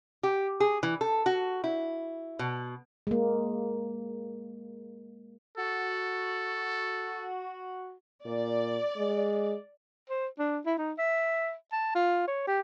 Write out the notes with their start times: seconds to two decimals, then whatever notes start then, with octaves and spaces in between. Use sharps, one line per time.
0.23 G4
0.60 G#4
0.83 E3
1.01 A4
1.26 F#4
1.64 E4
2.39 B2
3.07 G#3 A#3
5.58 F#4 A4
8.26 A#2 D5
8.97 G#3
10.09 C5
10.39 D4
10.65 E4
10.78 D#4
10.98 E5
11.72 A5
11.95 F4
12.27 C#5
12.47 G4